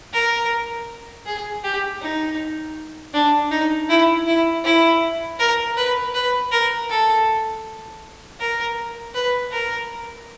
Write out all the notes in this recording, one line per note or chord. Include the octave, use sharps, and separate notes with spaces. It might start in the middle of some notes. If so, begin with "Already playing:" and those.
A#4
G#4
G4
D#4
D4
D#4
E4
E4
E4
A#4
B4
B4
A#4
A4
A#4
B4
A#4